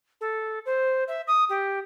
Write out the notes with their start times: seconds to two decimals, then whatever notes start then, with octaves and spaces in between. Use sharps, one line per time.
0.21 A4
0.66 C5
1.08 E5
1.27 D#6
1.49 G4